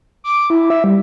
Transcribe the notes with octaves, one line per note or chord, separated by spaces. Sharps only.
D6
E4
E5
G3